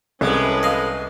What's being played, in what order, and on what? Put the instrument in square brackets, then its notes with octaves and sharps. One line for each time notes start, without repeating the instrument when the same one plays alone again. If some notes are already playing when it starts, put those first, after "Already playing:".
[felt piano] C2 [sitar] A2 G#3 [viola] C#4 B4
[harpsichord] D#5 F5